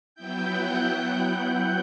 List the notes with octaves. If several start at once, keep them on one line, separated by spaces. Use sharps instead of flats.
F#3 B3 E4 G5 G6
F#5 F#6